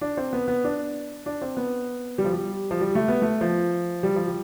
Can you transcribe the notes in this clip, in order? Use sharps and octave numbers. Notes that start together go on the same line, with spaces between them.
D4
C4
B3
B3
D4
D4
C4
B3
G3
F3
G3
F3
G3
A3
B3
A3
F3
G3
F3
G3